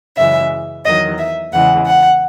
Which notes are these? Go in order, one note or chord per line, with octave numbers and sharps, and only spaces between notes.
F#2 C#3 E3 G#3 E5
E2 D#3 F#3 D#5
E5
E2 C#3 E3 G#3 F#5
F#5